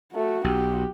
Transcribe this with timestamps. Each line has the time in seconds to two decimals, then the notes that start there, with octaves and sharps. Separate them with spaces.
0.15 A3 F#4
0.44 B1 G4